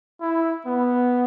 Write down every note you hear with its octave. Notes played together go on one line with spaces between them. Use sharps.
E4
B3